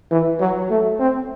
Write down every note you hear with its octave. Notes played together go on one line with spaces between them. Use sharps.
E3
F#3
A3
C4